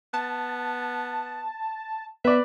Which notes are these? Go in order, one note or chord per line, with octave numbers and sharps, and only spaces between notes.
B3 A5
B3 B4 D5 E5